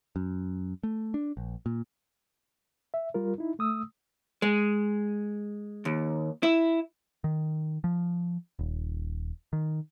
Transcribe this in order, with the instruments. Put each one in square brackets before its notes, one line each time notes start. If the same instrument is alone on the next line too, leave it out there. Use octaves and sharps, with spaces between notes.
[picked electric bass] F#2
A3
D4
A#1
A#2
[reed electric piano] E5
G3 F4 A#4
D#4 E4
A3 D#6 E6
[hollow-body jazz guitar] G#3
D#2
E4
[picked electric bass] D#3
F3
D#1
D#3